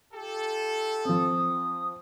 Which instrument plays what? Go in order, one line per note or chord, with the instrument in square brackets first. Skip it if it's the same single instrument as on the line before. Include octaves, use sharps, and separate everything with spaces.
[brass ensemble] F4 G4 A4
[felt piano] F3 C4 [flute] D#6